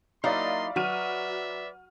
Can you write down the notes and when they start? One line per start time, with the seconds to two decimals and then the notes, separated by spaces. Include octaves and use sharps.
0.24 F#3 A#3 D#4 E4 D5 D#5 F5 C6
0.76 F#3 F#4 B4 D5 E5 F6 D#7